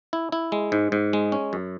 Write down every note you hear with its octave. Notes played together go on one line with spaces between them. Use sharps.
E4
E4
G#3
G#2
G#2
G#3
C#4
F#2